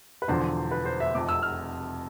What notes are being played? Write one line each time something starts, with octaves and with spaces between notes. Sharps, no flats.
B4
E1 E2 D3 F3 C5
B4
C5
E5
F1 F2 C3 D6
E6
F6